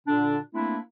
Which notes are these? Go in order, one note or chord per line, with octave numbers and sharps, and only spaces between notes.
A#2 D3 D4
A3 A#3 C4 D4 E4